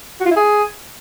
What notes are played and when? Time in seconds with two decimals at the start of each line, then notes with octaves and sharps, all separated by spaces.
0.21 F#4
0.26 F4
0.31 E4
0.36 G#4